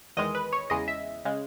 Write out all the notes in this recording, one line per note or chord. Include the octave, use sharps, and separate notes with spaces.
E2 D#3 G#3 D#5
B4
C#5
E2 C#3 G#3 D#5
E5
C#3 G#3